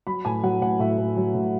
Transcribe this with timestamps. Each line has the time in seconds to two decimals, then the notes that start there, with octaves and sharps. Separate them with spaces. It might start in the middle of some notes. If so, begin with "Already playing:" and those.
0.07 F#3 B5
0.25 A2 G#5
0.43 F#3 F#5
0.61 A2 F#5
0.79 A2 E5
0.98 A2
1.17 F#3
1.35 A2